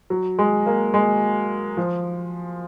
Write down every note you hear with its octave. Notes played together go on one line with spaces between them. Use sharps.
F#3
G#3
A#3
G#3
F3